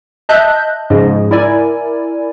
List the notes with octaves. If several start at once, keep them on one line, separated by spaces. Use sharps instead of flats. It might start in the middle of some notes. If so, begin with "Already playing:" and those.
D#5 E5 A5 F#6 G6
G#2 C#3 F3 D#5
E4 A#4 D5 G#5